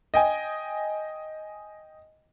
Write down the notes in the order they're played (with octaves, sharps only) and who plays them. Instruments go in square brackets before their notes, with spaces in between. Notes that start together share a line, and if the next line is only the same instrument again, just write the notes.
[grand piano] D#5 G5 G#5